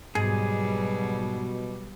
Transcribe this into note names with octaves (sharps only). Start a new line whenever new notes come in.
G#2 B2 F#3 G3 G#4